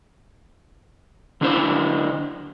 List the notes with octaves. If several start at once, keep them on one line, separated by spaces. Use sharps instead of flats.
D3 D4 E4 C5